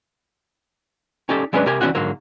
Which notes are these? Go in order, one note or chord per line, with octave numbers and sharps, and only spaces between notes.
C#4 D#4 G4 A4 D5
F#3 G#3 C#4 D4 B4
C3 G4 A#4 G#5
D2 E3 C4 C#4 F#4 F#5
G#2 D3 F#3 A#3